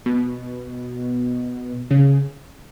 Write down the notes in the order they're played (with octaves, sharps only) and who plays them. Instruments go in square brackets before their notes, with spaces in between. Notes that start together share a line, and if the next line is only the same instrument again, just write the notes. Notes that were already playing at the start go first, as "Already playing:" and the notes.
[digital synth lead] B2
C#3